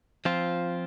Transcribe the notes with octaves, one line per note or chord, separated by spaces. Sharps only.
F3 C4 F4